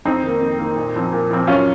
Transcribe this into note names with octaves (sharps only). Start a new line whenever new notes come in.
F2 C4 D#4
D#3 A#3
F2
D#3 A#3
A#2
F3 C4
A#2
F3 C4
F#2 C#4 F4